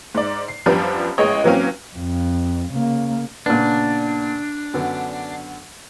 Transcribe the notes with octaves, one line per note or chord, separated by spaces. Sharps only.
G#2 D5
C7
F#2 F3 G3 B3 D4
A1 G#3 B3 C#5 D#5
E3 F#3 A#3 C4 C#4
F2
C#3 A#3
A#2 C#3 B3 D4
F#2 D3 B3